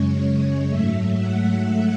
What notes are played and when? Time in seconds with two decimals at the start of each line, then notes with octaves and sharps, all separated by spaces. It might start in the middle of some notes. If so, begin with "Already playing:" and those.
Already playing: F#2 C#3 G#3 C#5
0.18 C#5
0.69 G#2 F#3 A3 E5
1.19 F#5